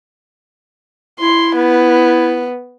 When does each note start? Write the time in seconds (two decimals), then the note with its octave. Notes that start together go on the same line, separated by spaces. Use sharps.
1.20 E4 C6
1.56 B3